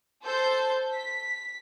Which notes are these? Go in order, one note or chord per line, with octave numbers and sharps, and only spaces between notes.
A4 C5 G6
B6